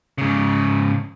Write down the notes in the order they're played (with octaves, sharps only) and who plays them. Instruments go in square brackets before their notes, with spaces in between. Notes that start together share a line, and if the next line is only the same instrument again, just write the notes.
[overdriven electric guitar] G#2 C#3